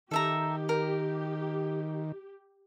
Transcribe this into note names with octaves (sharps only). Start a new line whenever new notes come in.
D#3 G4 A4 E5 A#5
A#4